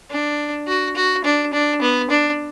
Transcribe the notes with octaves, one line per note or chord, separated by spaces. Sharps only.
D4
F#4
F#4
D4
D4
B3
D4